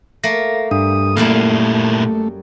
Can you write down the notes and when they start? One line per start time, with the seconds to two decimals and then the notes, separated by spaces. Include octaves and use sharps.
0.24 A3 A#3 A#6
0.71 G2 D4 D#6
1.17 F#2 A#2 G3 A3 A#3 E4 F5